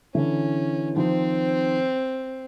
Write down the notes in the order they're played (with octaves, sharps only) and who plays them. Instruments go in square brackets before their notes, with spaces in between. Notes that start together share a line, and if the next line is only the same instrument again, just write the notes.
[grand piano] D3 E3 [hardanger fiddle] C#4
[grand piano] D#3 F3 [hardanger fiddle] C4